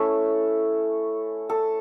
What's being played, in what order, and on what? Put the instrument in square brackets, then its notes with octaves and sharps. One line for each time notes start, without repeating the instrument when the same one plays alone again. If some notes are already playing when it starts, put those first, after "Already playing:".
Already playing: [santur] A3 C#4 E4 A4
A4